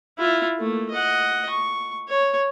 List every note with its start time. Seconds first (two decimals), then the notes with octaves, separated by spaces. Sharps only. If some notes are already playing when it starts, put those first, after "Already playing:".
0.18 E4 F4
0.59 A3 A#3
0.90 D#5 F#5
1.50 C#6
2.08 C#5